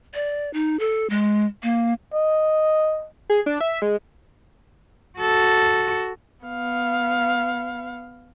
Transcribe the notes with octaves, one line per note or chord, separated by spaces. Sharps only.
D5
D#4
A4
G#3
A#3
D#5
G#4
D4
E5
G#3
F#4 A4
B3 F5